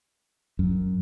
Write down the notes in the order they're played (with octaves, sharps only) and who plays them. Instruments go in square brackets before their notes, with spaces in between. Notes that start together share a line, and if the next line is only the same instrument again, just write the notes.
[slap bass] F#2